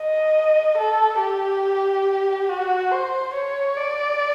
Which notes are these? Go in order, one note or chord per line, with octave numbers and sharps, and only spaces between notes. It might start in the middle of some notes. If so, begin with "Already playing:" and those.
Already playing: D#5
A4
G4
F#4
C5
C#5
D5